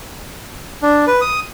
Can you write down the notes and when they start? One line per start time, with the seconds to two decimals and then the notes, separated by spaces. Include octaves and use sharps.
0.82 D4
1.07 B4
1.21 D#6